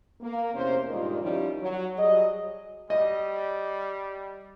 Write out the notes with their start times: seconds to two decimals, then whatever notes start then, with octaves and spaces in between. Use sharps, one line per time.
0.21 A#3
0.54 E2 C3 A#3 C#4 C5
0.90 G2 A#2 D#3 G#3 A#3 F4
1.22 D#3 F3 G3 C#4 D#4 E4
1.61 F#3
1.98 F#3 G3 G#4 D#5
2.90 G3 D#5